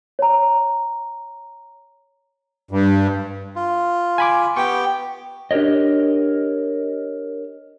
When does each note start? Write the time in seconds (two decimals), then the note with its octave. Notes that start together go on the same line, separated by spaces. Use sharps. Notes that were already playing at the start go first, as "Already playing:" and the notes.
0.19 C#5 A#5
2.71 G2
3.56 F4
4.18 G#5 B5 D6
4.57 B3 G4 G5 C#6
5.51 D4 G4 A#4 C#5 D#5